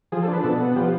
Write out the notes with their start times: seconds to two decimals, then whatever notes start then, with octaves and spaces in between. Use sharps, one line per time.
0.12 F3 G#4
0.23 A4
0.28 D4
0.33 B4
0.44 B2 A4
0.60 B3
0.76 F3 G4